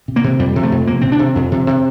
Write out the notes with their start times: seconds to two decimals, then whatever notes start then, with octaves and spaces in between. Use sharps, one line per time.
0.08 C3
0.16 A#3
0.24 C3
0.39 F2 G3
0.56 C3
0.63 A3
0.72 F2
0.87 C3 A#3
1.01 C3 C4
1.12 D4
1.19 C3
1.36 F2
1.52 C3
1.67 C3